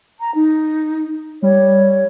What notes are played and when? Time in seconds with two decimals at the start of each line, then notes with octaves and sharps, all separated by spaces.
0.19 A#5
0.34 D#4
1.42 G3 C#5